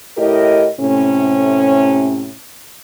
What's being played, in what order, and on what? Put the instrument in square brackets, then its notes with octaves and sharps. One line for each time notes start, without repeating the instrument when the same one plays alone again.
[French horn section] A2 E4 G4 A#4 D#5
A2 C3 C#4